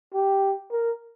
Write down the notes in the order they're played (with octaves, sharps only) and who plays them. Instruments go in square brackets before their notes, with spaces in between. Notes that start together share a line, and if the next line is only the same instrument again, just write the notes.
[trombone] G4
A#4